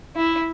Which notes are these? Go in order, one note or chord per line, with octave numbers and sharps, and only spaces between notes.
E4